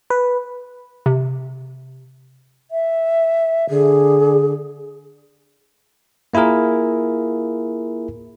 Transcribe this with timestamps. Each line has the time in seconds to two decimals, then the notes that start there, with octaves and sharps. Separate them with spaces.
0.10 B4
1.06 C3
2.71 E5
3.70 D3 G#4
6.34 A#3 E4 F4 G#4 A#4